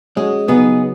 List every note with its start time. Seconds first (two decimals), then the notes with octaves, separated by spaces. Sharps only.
0.16 G#3 C#4 F#4
0.48 C#3 F#3 B3 D#4 G#4